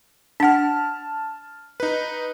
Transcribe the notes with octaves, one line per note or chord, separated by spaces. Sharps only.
D4 F#5 A5 F6
D#4 B4